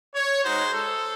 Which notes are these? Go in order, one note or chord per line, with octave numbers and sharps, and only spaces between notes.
C#5
G#3 D#4 F#4 C5
A4